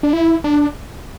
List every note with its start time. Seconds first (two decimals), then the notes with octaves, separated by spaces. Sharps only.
0.03 D4
0.13 E4
0.44 D4